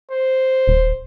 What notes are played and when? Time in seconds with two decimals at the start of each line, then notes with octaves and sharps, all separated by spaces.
0.11 C5
0.68 D#1